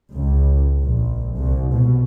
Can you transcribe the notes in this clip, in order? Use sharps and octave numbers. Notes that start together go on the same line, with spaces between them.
C#2
A#1
C2
B2